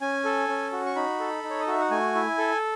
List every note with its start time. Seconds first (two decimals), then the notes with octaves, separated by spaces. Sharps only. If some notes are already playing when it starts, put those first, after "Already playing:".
0.01 C#4 G#5
0.25 A4
0.49 C#4
0.72 F#4
0.86 C#6
0.96 D#4 B5
1.20 A4
1.43 D#4
1.50 C#5
1.60 D#5
1.67 F#4 E5
1.81 F#5
1.91 A3 G#5
2.15 E4
2.38 A4